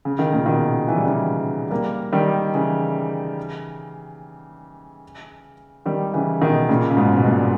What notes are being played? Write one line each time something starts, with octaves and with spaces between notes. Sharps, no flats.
C#3
D#3
A#2 C#3
B2 D#3
E3
G3
C#3 E3
G3 A#3
D#3 G3
C#3 E3
D#3 G3
C#3 E3
B2 D#3
A#2 C#3
C#3
G#2 B2
B2
G2 A#2